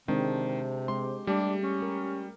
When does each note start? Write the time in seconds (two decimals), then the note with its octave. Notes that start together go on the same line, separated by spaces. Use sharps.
0.08 C3 D#3 G#3 C4 D4 C5
0.88 G#3 G4 C6
1.27 G3 A3 D4 G4
1.63 C#4
1.82 A#4